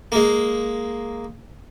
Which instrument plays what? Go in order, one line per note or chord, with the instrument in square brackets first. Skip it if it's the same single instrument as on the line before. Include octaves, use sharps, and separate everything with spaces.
[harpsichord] G#3 A#3